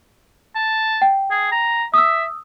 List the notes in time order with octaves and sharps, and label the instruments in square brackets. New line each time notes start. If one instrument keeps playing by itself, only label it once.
[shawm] A5
[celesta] G5
[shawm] G#4
A#5
[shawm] E5 [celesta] D#6 E6